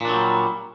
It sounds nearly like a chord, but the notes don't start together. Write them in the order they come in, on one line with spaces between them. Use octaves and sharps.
A#2 D4 F#3 G3